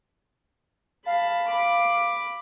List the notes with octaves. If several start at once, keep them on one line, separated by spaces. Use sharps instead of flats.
F5 A5 B5
B5 D6